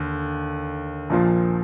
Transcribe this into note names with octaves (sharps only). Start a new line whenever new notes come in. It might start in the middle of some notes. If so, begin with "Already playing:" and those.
Already playing: D#2 D3
A#1 A#2 F3